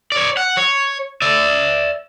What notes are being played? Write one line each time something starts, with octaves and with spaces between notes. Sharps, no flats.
C#5 D5
F#5
C#5
D5 E5